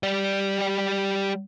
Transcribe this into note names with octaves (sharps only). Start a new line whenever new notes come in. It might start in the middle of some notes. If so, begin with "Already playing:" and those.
G3 D5